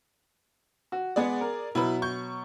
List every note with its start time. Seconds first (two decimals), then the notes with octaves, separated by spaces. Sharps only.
0.92 F#4
1.16 G#3 B3 G#4 D5 F#5
1.41 A#4
1.75 B2 F#3 E4 B4
2.02 C#6 G6